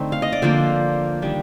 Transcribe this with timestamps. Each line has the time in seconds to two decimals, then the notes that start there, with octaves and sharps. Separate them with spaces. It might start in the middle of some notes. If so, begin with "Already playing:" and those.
Already playing: D3 A3 C4 D#4
0.12 F5
0.22 D#5
0.32 D5
0.42 D3 F3 A#3 C5
1.22 D#3 G3 D4